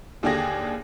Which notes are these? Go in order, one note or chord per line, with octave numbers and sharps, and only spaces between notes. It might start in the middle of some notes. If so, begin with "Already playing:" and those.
D#2 D3 D4 G4 G#4 A#6